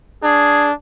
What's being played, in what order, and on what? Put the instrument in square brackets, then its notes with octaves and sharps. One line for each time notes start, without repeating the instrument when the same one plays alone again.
[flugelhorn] D4 [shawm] G#4